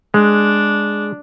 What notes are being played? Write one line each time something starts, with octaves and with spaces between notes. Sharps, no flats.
G#3 D4